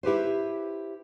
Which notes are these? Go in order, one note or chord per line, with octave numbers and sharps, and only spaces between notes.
E4 G4 B4 C5